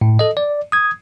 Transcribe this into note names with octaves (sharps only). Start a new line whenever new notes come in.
A2
A4 D#5
D5
D#6 G#6